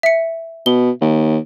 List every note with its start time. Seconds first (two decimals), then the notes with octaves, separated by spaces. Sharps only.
0.03 E5 C#7
0.66 B2 G7
1.01 D#2